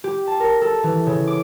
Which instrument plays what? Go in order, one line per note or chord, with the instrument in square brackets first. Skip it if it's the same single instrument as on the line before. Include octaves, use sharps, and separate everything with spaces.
[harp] G4
A5
A#4
A4
E3
C#3
D6